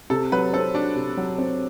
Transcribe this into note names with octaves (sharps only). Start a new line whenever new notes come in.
C3 A4
F#3 B4
C4 A4
D4 F#4
C3
F#3
C4